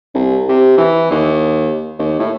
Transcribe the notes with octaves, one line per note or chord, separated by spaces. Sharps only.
C2
C3
E3
D#2
D#2
A2